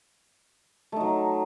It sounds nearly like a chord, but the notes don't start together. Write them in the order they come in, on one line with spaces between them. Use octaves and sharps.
A3 D#4 F#3